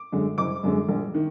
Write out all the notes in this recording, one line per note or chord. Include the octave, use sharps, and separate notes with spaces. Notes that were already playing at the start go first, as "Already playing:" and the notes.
Already playing: D6
F#2 D3 G#3
F#1 D6
F#2 D3 G#3
A#1
D#3